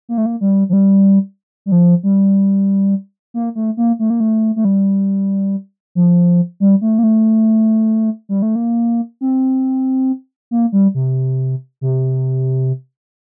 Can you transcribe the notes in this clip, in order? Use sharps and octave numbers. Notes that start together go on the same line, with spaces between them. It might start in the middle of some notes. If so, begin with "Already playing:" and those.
A#3
A3
A#3
G3
F3
G3
G3
F3
G3
A#3
A3
A#3
A3
A#3
A3
A3
G3
F3
G3
A3
A#3
A3
G3
A3
A#3
C4
A#3
G3
C3
C3